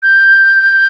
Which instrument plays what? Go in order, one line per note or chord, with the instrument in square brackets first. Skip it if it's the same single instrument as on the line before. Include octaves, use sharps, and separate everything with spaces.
[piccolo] G6